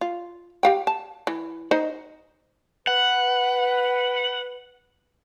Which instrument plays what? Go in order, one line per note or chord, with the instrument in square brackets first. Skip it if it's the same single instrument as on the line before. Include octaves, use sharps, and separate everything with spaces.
[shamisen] F4
G4 F5 G5
A5
E3
D#4 C5 D#5
[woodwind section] B4 [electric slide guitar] F#5